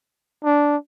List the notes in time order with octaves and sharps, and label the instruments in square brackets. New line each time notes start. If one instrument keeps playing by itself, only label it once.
[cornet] D4